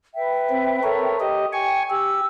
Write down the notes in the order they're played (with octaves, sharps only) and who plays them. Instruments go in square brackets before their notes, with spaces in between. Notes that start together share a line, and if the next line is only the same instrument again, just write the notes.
[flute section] B4 E5 G5
[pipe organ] C4
A4 A#4 C#5
G4 D#5
[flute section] G5 [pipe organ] G#5 C#6
[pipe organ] G4 [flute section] E6